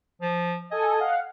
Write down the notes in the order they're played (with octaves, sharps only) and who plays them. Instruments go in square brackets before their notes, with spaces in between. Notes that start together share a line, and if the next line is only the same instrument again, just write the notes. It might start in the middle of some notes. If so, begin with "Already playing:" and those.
[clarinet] F3
[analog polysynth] A4 G#5 [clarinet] D#5
[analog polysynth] F5 F#5